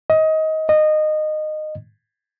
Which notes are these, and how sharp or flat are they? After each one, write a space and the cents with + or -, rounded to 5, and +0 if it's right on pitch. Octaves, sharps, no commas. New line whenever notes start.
D#5 +20
D#5 -20